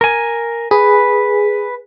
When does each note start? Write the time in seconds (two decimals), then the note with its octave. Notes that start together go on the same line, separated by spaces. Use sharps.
0.01 A#4 G#5
0.71 G#4 B4